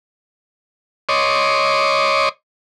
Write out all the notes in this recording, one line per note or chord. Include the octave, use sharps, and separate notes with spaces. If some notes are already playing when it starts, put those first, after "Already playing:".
C#5 D#5 C6 D6